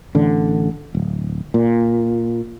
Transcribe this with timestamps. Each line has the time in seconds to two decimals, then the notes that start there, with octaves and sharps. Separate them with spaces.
0.15 A1 D3
0.95 D1
1.54 A#2